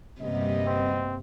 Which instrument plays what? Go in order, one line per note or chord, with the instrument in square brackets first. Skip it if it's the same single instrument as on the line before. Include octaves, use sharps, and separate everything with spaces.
[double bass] G1 [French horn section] F#2 B3 D#5 [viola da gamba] C3 G3 A#3
[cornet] C4